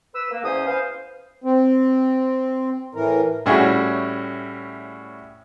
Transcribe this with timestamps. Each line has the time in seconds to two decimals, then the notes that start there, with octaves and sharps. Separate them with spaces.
0.14 B4 E6
0.31 A#3
0.44 E2 C#4 C5 D#6
0.67 B4 C5 F5
1.44 C4
2.95 A2 E3 A#4
3.46 A2 G3 C#4 E4 F#4 G#4